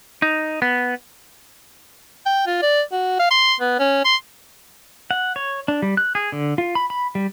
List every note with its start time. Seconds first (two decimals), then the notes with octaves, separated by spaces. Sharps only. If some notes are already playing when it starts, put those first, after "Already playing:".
0.22 D#4
0.62 B3
2.26 G5
2.47 F4
2.62 D5
2.92 F#4
3.19 F5
3.31 C6
3.60 B3
3.79 C#4
4.05 C6
5.11 F#5
5.36 C#5
5.68 D4
5.82 G3
5.97 F#6
6.15 G#4
6.32 D3
6.58 F4
6.75 B5
6.90 B5
7.15 G3